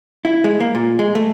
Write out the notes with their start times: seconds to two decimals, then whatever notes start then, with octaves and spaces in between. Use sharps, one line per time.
0.25 E4
0.44 G#3
0.60 A#3
0.75 A#2
0.99 G#3
1.15 A3